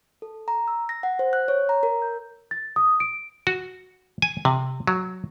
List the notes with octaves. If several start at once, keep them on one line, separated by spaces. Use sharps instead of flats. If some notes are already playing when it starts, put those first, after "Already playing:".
A4
A#5
E6
A#6
F#5
C5
F#6
C#5
A#5
A#4
G6
A6
D#6
D7
F#4
G#5
C3
F#3